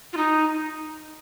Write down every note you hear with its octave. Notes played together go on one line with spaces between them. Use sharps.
F4
D#4